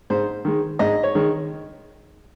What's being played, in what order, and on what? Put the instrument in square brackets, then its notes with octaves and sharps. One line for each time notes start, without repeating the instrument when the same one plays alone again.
[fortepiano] G#2 C5
D#3 G#3
G#2 D#5
C#5
D#3 G#3